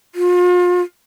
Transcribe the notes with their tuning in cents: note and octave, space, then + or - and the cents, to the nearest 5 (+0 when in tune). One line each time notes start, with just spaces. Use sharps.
F4 +35